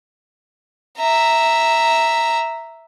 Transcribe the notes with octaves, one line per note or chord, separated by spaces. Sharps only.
E5 A#5